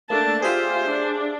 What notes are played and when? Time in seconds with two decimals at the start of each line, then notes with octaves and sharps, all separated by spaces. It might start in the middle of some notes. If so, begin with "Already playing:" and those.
0.10 A3 A#3 D4 A5
0.42 F4 G4 G#4 C5 E5 F5
0.89 D4